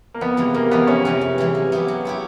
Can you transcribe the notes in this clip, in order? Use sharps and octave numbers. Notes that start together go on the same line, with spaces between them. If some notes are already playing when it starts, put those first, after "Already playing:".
A#3
F2 B3
C3 E3 G#3
F2 A#3
C3 E3 G#3 B3
F2 C#4
C3 E3 G#3
F2
C3 E3 G#3
F#3
B3 E4 G4
F#3
B3 E4 G4